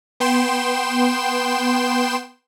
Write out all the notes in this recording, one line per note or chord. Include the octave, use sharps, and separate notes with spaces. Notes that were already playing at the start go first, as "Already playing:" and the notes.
B3 G5 C6 E7